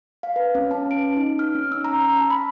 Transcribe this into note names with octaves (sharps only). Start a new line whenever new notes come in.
F5
B4
C#4
A5
D7
D#4
F6
C#4
E6
A#5
A5
B5